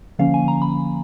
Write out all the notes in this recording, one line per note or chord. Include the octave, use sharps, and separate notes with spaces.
D3 F3 A#3 C#4 F5
G#5
A#5
B5